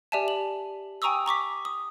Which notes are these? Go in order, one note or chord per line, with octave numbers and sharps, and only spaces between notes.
G4 D5 E5 G#5 A5
F#7
G5 G#5 A#5 C#6 D#6 E6
A#5 C#6 D6 B6
D#6